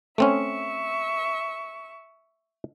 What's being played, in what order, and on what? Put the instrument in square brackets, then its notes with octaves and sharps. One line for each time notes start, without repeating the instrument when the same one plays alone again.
[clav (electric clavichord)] A3 C4 C#4 [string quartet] E5 C#6